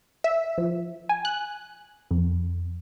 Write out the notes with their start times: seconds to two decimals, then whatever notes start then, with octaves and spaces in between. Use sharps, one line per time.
0.24 E5
0.58 F3
1.09 G#5
1.25 F#6
2.11 F2